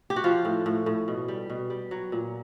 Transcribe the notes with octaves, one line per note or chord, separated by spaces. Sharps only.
G4
F#4
F3 F4
A2
A2
A2
B2
G3
B2
G3
F#3
A#2